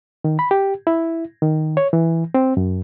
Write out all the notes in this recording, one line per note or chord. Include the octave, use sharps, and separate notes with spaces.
D#3
B5
G4
E4
D#3
C#5
E3
C4
F#2